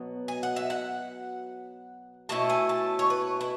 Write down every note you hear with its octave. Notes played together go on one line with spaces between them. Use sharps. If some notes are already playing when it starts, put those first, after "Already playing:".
Already playing: B2 F#3 B3
G#5
F#5
E5
F#5
B2 A3 C#4 E4 A5
G#5
A5
C#5
B4
E4